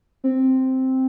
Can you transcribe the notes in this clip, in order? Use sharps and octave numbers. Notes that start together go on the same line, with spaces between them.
C4